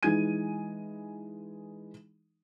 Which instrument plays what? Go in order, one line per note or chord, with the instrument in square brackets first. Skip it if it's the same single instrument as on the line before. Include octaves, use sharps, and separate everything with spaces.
[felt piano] E3 G#3 D#4 G#5 G#6 D#7